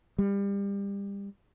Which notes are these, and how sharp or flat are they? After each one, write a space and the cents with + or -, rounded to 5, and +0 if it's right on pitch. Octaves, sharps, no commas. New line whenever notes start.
G3 +30